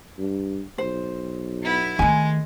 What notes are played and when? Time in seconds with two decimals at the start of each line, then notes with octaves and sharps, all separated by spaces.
0.18 G2
0.78 B1 C5
1.62 B3 E4
1.99 D#3 G#3 A3 G#5